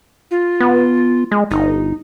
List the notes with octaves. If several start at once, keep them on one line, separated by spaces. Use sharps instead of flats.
F4
B3
G#3
G1 D#4